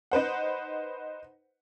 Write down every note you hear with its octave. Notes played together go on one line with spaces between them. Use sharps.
D#4 B4 C5 F#5